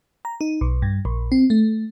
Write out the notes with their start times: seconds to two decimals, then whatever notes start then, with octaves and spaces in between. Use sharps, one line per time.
0.25 A#5
0.41 D#4
0.61 B1
0.82 G2
1.05 A#1
1.32 C4
1.50 A3